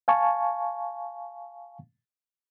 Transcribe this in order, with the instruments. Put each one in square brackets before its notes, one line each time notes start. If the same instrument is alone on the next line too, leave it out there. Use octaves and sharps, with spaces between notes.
[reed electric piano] F5 G#5 A5 C#6